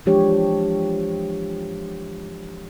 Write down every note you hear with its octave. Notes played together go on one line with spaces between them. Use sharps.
E3 F3 G#3 D4 G4 C#5